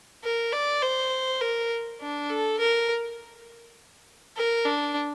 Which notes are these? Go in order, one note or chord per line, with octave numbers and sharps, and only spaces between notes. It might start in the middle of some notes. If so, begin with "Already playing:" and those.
A#4
D5
C5
A#4
D4
A4
A#4
A#4
D4